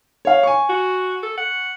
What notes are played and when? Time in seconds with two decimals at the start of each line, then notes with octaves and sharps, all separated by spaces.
0.25 C#5 F5
0.43 G#5 C#6
0.69 F#4
1.23 A4
1.37 F#5